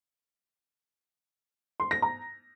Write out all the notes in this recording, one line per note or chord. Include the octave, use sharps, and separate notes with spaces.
C6
A#6
A#5